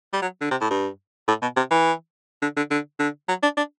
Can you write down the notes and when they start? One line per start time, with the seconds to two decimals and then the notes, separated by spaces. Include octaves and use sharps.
0.13 G3
0.22 F#3
0.41 D3
0.51 C3
0.61 A2
0.70 G2
1.28 A2
1.42 B2
1.57 C3
1.71 E3
2.42 D3
2.57 D3
2.70 D3
2.99 D3
3.28 F#3
3.43 D4
3.57 D4